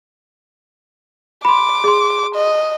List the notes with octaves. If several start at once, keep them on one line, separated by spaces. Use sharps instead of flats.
B5 C6 D6
G#4 C6
D#5